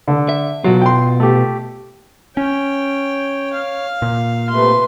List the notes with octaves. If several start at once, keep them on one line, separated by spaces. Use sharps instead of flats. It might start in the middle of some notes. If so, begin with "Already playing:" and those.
D3
E5
B2 F#3 F4
G5 C6
A3 G4
C#4 C#5 G5
F5
A#2
C3 A3 B4 C6